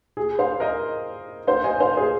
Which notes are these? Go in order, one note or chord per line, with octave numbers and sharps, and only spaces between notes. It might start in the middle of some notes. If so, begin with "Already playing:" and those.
G#4
C5 F5
A#4 D#5
C5 F5
D#5 G#5
C5 F5
G#4 C5